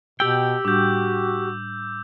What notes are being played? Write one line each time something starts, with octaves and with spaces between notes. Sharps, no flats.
B2 G4 G5 E6
A2 G3 D4 F#4 D6 G6